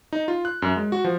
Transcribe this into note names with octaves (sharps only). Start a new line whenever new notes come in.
D#4
F4
F#6
F#2
G#3
F#4
F3